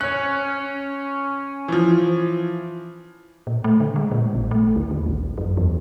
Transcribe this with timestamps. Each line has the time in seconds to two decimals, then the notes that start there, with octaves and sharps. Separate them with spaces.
0.01 C#4 C#5 F#6
1.68 E3 F3
3.47 A#2
3.64 A3
3.80 D3
3.96 G#3
4.12 A#2
4.35 A1
4.51 A3
4.76 D2
4.91 D#2
5.06 A1
5.38 F#2
5.57 E2